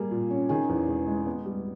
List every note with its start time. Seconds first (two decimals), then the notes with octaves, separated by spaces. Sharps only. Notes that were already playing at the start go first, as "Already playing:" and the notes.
Already playing: G3 A#3 G#4
0.11 A#2
0.30 C#4
0.49 D#3 G#4
0.69 E2
0.88 E1
1.07 G#3
1.26 B3
1.45 G3